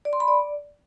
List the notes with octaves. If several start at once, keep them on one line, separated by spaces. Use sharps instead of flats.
D5
C6
B5
D5